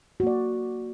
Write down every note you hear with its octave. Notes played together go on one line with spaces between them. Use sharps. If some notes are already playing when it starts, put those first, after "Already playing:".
A#3 F#4 D5